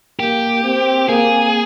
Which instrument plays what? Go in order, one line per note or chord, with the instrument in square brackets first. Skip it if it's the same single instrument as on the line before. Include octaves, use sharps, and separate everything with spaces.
[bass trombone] A#3 [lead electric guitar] G4
[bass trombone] C4
[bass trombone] A#3 [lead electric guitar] G#4